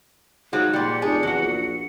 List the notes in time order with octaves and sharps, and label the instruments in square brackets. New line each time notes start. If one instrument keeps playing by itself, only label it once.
[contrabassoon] G#2 [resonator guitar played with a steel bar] F3 F#3
[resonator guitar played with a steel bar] A#2 G3 [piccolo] C#7
[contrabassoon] F1 [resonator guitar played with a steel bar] D4 G#4
[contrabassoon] E2 [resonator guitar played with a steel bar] F#3 F#4
[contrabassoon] A#1